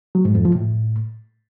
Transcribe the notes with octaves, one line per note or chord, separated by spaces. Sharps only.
F#3
G#2
F2
F3
A2